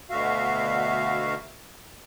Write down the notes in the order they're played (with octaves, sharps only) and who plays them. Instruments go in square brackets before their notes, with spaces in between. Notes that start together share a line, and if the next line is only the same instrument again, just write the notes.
[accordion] D2 B2 D3 F#4 E5 F5